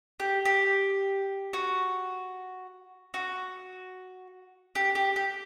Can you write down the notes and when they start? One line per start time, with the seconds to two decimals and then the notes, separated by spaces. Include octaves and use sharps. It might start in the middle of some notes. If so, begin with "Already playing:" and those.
0.20 G4
0.45 G4
1.53 F#4
3.14 F#4
4.75 G4
4.95 G4
5.16 G4